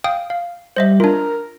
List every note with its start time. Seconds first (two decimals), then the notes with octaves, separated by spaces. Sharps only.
0.04 F5 G5 D#6
0.30 F5
0.76 G3 C5 D#5 E5
1.00 D4 F4 A#4